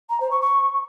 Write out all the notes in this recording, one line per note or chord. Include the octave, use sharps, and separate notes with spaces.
A#5
C5
C#6
C#6